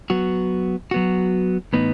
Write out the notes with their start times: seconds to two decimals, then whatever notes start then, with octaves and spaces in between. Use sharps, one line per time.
0.10 F#3 B3 F#4
0.91 F#3 B3 F#4
1.73 A2 E3 B3 D#4